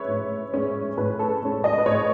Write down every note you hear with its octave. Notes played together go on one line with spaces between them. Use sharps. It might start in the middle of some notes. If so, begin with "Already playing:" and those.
Already playing: G#3 C#4 B4 C#5 E5
A2
G#3 C#4
A2 B4
A4
G#3 C#4
D#5
B4
A2 C#5